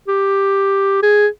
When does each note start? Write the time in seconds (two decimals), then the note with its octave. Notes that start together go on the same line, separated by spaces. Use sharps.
0.08 G4
1.03 G#4